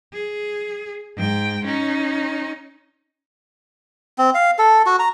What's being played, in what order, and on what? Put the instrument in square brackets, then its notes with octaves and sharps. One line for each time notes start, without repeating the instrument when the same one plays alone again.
[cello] G#4
G#2 G5
C#4 D#4
[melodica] C4
F5
A4
F#4
A#5